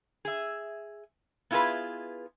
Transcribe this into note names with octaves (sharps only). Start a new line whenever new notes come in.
G#4 E5
B3 E4 F4 G#4 B4